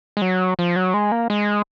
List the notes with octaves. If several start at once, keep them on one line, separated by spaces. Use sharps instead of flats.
G#3
F#3
F3
F#3
G#3
A#3
G#3